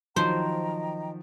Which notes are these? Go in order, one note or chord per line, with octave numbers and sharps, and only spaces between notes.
D#3 F3 F#3 C5 D#5 G5 A#5